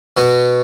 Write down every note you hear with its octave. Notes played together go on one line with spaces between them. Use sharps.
B2 B3 F#4